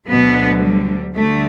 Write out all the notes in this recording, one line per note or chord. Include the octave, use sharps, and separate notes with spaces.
D2 B2 D3 F#3 B3
G3
D2 D3 G3 A3